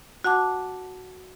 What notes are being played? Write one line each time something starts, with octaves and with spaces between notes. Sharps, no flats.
F#4 F#5 A5 D6